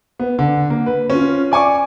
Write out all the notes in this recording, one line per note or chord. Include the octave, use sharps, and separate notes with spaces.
B3
D3
A#3
B4
C#4 F4
D5 G#5 C#6 D6